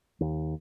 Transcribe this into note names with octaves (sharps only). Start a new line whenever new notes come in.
D#2